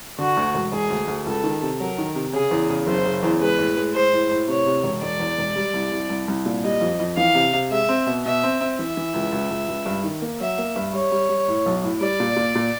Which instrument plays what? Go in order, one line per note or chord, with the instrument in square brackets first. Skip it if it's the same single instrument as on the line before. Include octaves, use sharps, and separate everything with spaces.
[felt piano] D3 [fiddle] F#4
[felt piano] D2
E1
[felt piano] E1 [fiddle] G#4
[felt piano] D2
D2
[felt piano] C#2 [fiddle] A4
[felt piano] D#3
C3
[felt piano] F#3 [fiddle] A#4
[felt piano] D#3
C3
[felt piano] C#3 [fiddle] G#4
[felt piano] E2
C#3
[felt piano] F#1 [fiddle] C5
[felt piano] C#3
E2
[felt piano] G#3 [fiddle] B4
[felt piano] A2
G#3
[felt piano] G#3 [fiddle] C5
[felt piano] A2
A2
[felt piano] C3 [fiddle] C#5
[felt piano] C3
E1
[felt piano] E1 [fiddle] D5
[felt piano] E2
E1
G3
C2
C2
C2
C2
A#2
[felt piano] G3 [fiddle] D#5
[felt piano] F2
F2
[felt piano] E3 [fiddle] F5
[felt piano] C3
C3
[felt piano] G#3 [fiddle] E5
[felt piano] C4
B2
[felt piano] B2 [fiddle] E5
[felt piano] C4
C4
[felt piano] E3 [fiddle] E5
[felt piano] E3
C#2
C#2
C#2
C#2
G2
D#3
A#3
[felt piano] F#3 [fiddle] E5
[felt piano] A#3
G2
[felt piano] G3 [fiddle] C#5
[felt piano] G3
G3
A2
B1
A2
[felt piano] G3 [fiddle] D5
[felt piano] A#2
A#2
A#2